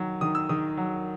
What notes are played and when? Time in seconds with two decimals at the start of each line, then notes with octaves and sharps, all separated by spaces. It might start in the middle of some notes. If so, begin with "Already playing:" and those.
Already playing: D#3 F#3
0.21 D#3 D#6
0.35 E6
0.49 D#3 D#6
0.77 F#3